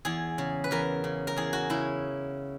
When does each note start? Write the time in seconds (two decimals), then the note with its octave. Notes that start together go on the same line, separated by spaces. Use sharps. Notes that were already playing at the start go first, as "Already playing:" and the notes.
0.05 E2 G#4
0.38 C#3
0.64 B4
0.71 E2 A#4
1.04 C#3
1.27 A#4
1.36 E2 G#4
1.53 F#4
1.70 C#3 E4